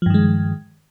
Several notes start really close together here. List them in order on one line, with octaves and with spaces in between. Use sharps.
F3 G2 D#3 G#3